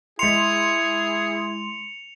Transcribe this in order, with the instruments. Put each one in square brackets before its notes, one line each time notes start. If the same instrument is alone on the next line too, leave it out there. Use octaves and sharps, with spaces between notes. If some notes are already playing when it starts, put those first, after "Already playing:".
[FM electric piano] G#3 C6 [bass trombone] E4 [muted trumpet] G#4 [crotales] C#7 F7